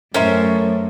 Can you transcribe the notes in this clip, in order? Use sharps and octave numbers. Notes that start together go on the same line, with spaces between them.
F#2 A2 C#4 A#4 C5 E5